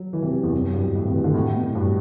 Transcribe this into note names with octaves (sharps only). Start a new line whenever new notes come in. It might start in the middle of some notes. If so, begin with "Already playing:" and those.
Already playing: F#3
E3
C3
E2
F#2
G2
A2
C3
E3
D3
A2
B2
G2